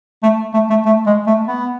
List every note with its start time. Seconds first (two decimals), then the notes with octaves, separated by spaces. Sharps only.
0.23 A3
0.54 A3
0.70 A3
0.85 A3
1.06 G#3
1.27 A3
1.47 B3